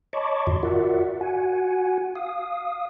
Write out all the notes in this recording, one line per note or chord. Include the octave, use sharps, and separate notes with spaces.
C#5 D#5 A5 B5 C#6 D6
F2 G#2 D3 F#4 D#5 C6
F4 F#4 A#4 D5 E5 F#5
F#4 F#5 G#5
F5 D#6